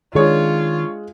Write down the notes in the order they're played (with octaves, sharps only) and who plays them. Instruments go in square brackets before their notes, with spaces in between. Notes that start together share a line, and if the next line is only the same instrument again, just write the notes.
[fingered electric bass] D#3 [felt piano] G#3 G#4 [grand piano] D4 C#5 [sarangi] F4